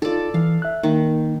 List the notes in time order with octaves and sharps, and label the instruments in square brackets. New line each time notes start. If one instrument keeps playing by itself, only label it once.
[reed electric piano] D#4 F4 [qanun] A4 D5
[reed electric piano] E3 [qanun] F5
[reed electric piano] E5 F#6
[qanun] D#3 [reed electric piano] A#3 D#4